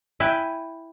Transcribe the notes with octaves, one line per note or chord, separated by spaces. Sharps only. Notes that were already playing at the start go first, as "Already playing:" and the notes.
E4 B4 G5 G#5